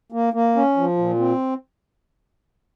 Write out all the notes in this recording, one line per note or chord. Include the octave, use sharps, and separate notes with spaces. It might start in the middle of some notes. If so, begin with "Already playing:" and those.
A#3
A#3
C#4
F3
A#2
C4